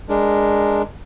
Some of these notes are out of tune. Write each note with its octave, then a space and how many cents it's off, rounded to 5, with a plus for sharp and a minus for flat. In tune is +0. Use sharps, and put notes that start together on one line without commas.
G#3 +0 D4 +5 A#4 +0